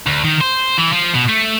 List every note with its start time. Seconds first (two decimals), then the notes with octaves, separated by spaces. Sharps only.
0.07 D2
0.24 D#3
0.41 C5
0.78 E3
0.93 F3
1.14 B2
1.29 A3